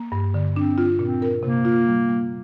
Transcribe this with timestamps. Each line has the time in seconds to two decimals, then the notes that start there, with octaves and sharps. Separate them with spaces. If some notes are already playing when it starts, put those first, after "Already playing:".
Already playing: A#3
0.12 G2
0.34 D3
0.56 C4 D4
0.78 F4
0.99 A#2 C4
1.22 A#4
1.43 C3 A#3
1.65 F4
1.88 G3
2.09 G3